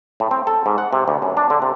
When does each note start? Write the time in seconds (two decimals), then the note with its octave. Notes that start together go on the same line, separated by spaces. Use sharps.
0.20 A2
0.31 C4
0.47 A4
0.66 G#2
0.78 F#5
0.93 C3
1.08 D2
1.22 F#2
1.37 D4
1.50 D3
1.62 C3